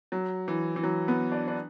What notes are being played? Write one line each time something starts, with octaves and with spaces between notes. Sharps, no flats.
F#3
E3
E3
F#3
B3
D4
D4